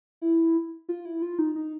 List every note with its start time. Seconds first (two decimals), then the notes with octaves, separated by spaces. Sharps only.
0.22 E4
0.89 F4
1.05 E4
1.22 F4
1.39 D#4
1.56 D#4